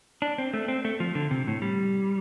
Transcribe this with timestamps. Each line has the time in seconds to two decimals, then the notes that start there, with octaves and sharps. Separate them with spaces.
0.22 D4
0.38 C4
0.53 A3
0.68 C4
0.85 A3
1.00 F3
1.15 D3
1.31 C3
1.47 A2
1.62 G3